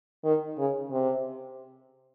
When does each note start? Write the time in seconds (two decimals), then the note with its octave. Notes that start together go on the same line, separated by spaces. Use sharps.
0.24 D#3
0.58 C#3
0.91 C3